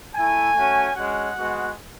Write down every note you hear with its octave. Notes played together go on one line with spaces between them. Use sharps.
A3 E4 G#5
A3 C#4 F#4
G#3 C#4 F#4 F#5
G#3 B3 F#4